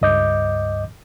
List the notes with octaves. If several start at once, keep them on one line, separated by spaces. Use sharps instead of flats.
C#2 G2 D#5 D6 G6